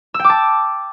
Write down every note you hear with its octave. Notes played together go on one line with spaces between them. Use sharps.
E6
G5
D6
A5